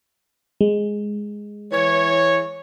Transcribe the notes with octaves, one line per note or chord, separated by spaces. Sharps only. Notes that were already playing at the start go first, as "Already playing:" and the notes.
G#3
E3 C#5